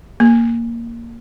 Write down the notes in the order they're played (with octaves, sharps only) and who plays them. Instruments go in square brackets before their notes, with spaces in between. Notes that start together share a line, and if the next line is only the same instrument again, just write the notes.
[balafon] A#3